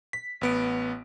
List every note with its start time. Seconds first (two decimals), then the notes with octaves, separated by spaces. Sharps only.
0.13 B6
0.41 A1 B3 D7